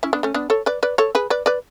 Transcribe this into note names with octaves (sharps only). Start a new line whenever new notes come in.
C#4 E4
B3 D4
A3 C#4
B3 D4
A4 C#5
B4 D5
B4 D5
A4 C#5
G#4 B4
B4 D5
B4 D5